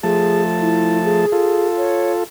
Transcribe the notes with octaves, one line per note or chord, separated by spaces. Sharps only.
F3 A3 G#4 A5
E4
G#4
F4 A4
C#5